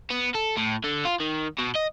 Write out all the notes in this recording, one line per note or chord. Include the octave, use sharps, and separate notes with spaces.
B3
A4
A2
D3
F4
D#3
B2
D#5